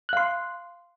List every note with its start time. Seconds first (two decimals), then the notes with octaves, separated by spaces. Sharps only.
0.09 F#6
0.13 F5
0.17 C6